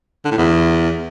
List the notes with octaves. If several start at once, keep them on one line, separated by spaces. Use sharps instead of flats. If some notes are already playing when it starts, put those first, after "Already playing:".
D3
A2
E2